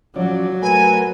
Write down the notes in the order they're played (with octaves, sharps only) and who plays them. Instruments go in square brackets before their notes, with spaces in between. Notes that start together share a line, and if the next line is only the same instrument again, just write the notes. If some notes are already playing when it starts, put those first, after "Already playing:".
[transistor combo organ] F3 C#4 D5 [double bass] F#3
[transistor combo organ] A3 A#4 B4 [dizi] G#5